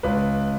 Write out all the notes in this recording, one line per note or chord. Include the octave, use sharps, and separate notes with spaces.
C#2 B4